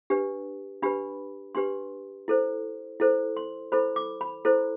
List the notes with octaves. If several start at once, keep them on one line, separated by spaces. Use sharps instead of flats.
D4 G4 B4
D4 G4 B4 B5
D4 G4 B4 C6
E4 A4 C5
E4 A4 C5
C6
E4 A4 C5 B5
D6
B5
E4 A4 C5